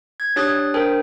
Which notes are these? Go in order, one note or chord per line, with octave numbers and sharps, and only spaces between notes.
G#6
D4 G4 C#5 D#6 F#6 A6
D4 A#4 C5 G5